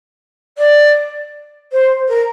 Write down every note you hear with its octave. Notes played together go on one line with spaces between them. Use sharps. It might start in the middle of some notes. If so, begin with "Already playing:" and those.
D5
C5
A#4